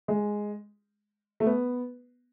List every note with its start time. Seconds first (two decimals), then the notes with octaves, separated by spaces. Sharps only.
0.08 G#3
1.40 A3
1.46 B3